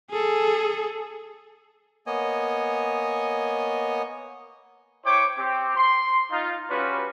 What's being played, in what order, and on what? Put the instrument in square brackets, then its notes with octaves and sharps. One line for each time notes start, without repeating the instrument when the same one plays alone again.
[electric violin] G#4 A4
[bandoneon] A#3 B3 C#5 D#5 G#5
[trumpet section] E4 C5 C#5 G5 C#6 D6
C4 G4
C6
D#4 F4
G3 C#4 F4 F#4 B4